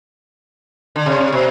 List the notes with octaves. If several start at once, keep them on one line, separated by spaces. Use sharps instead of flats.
D3
C3
B2